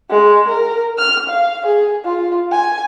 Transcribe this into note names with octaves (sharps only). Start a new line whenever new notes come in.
G#3
A#4
F6
F5
G#4
F4
G#5